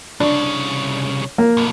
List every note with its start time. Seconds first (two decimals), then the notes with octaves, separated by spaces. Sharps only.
0.20 C2 C#3 D4
1.38 A#3
1.57 B1 F2